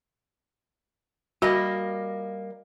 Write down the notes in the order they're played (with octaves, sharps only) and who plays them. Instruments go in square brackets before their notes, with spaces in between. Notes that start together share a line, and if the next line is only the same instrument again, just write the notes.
[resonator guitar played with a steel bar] G3 A#3 D#5 [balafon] F#4